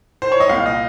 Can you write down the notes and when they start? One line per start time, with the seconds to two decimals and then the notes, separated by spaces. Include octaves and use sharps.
0.22 C5
0.32 C#5
0.40 D#5
0.49 C2 A#2 F5
0.66 D#5